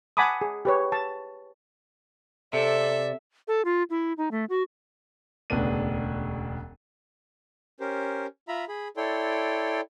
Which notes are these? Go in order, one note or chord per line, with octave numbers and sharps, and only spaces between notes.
F#5 G#5 A5 B5 D6 D#6
G#4
G4 B4 C#5
A5
C3 A4 D5 E5
A4
F4
E4
D#4
A3
F#4
E1 D2 C#3 B3 D4 D#7
C#4 G4 A#4 C5
F4 E5 A#5 B5
G#4 B5
E4 A4 C#5 D5 G5 C6